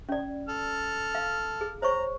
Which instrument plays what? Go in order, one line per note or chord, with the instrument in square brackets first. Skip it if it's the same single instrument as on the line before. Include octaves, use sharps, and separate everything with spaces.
[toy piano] C#4 D5
[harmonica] A4 F6
[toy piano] F5
G#4
[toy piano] C5 C#5 C#6 [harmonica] A#5